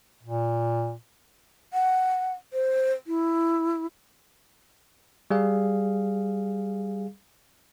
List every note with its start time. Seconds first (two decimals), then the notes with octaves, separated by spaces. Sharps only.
0.23 A#2
1.73 F#5
2.53 C5
3.07 E4
5.31 G3 G#4 F5